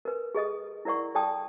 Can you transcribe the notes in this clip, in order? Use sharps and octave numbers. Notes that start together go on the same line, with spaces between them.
A#4 B4
G#4 A4 D#5 D#6
E4 A#4 D5 F#5 C#6
A4 D5 G5 A5 D#6